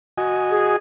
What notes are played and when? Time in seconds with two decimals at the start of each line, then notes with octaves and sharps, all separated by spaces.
0.18 F#4 D#5 G#5
0.51 G#4